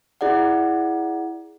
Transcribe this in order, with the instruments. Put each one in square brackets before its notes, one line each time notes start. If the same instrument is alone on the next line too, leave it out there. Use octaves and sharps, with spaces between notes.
[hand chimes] E4 G#4 D5 F#5